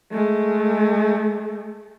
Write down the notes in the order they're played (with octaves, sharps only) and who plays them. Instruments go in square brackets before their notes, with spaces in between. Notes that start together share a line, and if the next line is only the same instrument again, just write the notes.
[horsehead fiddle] G#3 A3